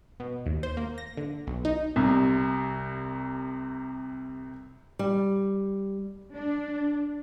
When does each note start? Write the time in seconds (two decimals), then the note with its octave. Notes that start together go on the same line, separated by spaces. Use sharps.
0.20 B2
0.46 D#2
0.63 C5
0.77 A#3
0.98 A#6
1.17 D3
1.47 B1
1.65 D#4
1.96 C2 C3
4.99 G3
6.35 D4